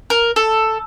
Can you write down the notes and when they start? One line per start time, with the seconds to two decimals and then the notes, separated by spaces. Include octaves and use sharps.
0.10 A#4
0.36 A4